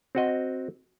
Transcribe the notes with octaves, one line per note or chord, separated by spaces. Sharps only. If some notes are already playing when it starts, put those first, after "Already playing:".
C4 F#4 D#5